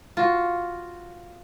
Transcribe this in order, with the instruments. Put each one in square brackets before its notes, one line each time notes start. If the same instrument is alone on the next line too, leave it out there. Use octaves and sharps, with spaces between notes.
[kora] F4 F#4